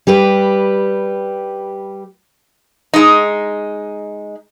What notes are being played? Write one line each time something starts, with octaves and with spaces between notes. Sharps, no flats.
G3 G4 B4
G#3 D#4